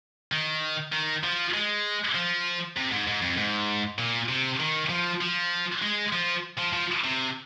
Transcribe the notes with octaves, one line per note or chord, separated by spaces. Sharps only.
D#3
D#3
F3
G#3
F3
C3
G#2
G#2
F2
G#2
A#2
C3
D#3
F3
F3
G#3
F3
F3
F3
C3